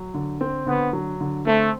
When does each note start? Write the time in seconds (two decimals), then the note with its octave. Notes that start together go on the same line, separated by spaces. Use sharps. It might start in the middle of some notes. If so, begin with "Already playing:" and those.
Already playing: F#3
0.14 D3
0.41 C4
0.67 D3 B3
0.93 F#3
1.21 D3
1.47 A3 C4